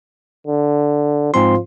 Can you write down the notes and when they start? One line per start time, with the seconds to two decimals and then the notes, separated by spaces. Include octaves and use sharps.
0.47 D3
1.34 G#2 F3 C4 C6